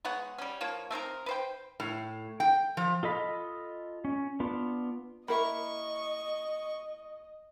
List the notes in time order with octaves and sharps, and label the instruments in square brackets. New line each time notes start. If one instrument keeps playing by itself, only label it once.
[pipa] G#3 B3 C#5 F#5
G3 C#4
F3 A#3 F4 C#5
A3 C4 D#4 A#4
B4 C5 G5
[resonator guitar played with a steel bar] A2
G5
F3
[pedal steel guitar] F4 A4 D#5 B5
C#4
B3 D4 F4
[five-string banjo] A#3 E4 A#4 [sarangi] D#5 [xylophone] E5 B5 [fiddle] C#6